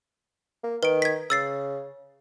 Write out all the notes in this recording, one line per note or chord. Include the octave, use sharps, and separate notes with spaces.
A#3
D#3 B4 D7
G#6 B6
C#3 E6 A6 C7